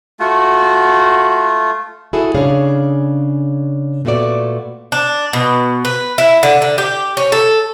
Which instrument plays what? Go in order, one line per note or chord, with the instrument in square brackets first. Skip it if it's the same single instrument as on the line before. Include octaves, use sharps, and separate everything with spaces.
[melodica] A3 F4 [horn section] F#4
[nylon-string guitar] E4 F#4 G#4 A4
C#3 D4 G#4 C#5 F5
A#2 A3 B3 F#4 D5
[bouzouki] D4
B2
B4
E4
D3
D3
G4
C#4
A4